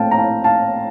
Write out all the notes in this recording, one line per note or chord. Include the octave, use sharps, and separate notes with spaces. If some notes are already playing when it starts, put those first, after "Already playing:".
Already playing: A#1 A2 A3 C4 F5 G5 A5
A#5
F5 A5
F5 A5